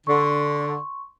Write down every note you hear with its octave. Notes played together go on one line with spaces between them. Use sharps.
D3 C6 C#6